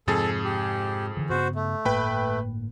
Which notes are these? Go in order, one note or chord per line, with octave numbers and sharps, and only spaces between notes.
F2 G#2 C3 G#4 A4 A6
G4
D3 E3
G2 C#3 B3 F#4 C5
A3
G1 A2 A#3 B4 G5 B5